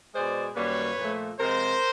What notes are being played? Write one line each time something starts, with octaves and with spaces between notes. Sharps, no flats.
B2 G#3 C5 D5
F#2 D#3 G3 A#3 B4 C#5
A#2 F3 A3
C3 F3 G#3 A#4 C5